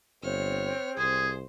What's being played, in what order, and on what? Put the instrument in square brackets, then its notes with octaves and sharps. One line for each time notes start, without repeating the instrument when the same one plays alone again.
[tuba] G1 [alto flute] C4 [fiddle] C#5 F6
[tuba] C2 [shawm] G#4 [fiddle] C5